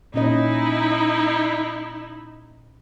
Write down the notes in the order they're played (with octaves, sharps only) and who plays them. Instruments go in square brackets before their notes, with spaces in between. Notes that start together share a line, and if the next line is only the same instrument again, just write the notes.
[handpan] A#2 C#4 D#5 [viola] D#4 E4